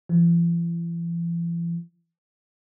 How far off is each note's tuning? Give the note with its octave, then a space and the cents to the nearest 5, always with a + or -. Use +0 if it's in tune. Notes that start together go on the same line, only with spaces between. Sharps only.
E3 +45